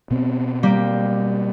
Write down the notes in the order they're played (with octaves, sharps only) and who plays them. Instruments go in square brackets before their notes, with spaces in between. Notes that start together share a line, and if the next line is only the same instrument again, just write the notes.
[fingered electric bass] B2 B3 C4
[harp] G3 A#3 G4